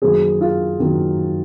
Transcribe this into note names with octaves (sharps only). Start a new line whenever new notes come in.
F#2 D#3 F#3 A#3 G#4 C5
F4 G#4
F#2 D#3 F#3 A#3